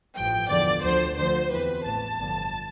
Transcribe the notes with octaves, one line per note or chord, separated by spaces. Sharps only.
A1 G2 F3 G5
E2 D3 F3 D5
D2 D3 F3 C5
D2 D3 F3 C5
E2 C3 E3 B4
A1 A2 E3 A5
G1 F2 D3 F3